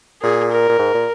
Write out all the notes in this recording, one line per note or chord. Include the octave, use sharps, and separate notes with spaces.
A#2 G#4
A#4
A#2
G#2
A#2